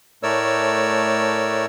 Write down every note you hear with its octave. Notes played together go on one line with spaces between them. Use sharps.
A2 A3 A#4 C#5 D5 E6